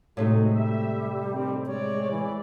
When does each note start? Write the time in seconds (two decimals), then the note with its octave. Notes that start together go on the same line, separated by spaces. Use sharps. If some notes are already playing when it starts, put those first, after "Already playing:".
0.17 A2 C3 G#3 A3 D#4 F#4
0.55 G3 E5
1.33 D3 D#3 C4
1.66 G#3 C4 C#5 D5
2.12 E3